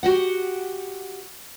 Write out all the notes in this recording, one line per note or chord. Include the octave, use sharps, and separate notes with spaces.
F#4 G4 F#5